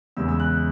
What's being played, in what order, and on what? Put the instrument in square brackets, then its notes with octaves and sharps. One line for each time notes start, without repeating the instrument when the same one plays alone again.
[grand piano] E2 C#3 G#3 B3 E6
E6
F#6